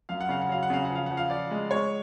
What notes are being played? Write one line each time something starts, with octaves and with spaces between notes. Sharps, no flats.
F#2 F5
F#5
C#3 F5
F#5
F#3 F5
F#5
C#3 F5
F#5
F3
F5
F3 F#5
F5
F3 D5
G#3
G#3 C#5